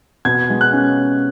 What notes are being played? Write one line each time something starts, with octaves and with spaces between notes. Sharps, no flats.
B2 G#6
G#3
F#6
C#4